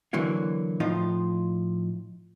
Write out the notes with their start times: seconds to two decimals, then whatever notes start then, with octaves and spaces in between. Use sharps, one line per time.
0.13 D3 E3 F#3 A#3 E4
0.80 A2 F3 D#4 F4